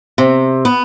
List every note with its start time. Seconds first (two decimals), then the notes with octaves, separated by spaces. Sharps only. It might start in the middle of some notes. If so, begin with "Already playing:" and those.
0.18 C3
0.65 B3